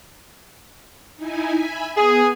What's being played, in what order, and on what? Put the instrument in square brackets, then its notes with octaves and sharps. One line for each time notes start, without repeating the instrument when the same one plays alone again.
[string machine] D#4 E4 G#5
E5 G#5 B5
[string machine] B3 [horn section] G#4